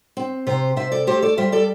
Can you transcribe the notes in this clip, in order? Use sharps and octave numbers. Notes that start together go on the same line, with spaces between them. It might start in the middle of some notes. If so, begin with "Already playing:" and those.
C4
C3 G4 C5
C3 C5 E5
A4 D5
A3 G4 C5
A4 D5
G3 C5 E5
A4 D5